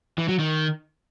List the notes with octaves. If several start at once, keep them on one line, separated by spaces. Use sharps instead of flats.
E3
F#3
D#3